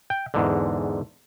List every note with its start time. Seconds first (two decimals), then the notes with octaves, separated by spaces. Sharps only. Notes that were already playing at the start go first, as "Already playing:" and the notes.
0.10 G5
0.34 E2 G#2 D3